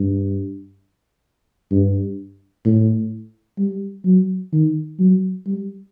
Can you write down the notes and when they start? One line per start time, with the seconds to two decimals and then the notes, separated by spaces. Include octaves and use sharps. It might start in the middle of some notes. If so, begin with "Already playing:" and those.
Already playing: G2
1.71 G2
2.65 A2
3.59 G3
4.05 F#3
4.53 D#3
5.00 F#3
5.47 G3